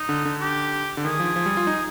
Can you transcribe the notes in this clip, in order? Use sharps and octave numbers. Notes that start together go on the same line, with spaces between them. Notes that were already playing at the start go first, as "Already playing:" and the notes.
Already playing: D#4
D3
D3
G4
D3
D#3 G#4
F3
F3
G3
F4
D#4